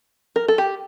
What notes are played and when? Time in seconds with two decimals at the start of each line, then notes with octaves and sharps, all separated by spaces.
0.36 A#4
0.48 A4
0.58 G4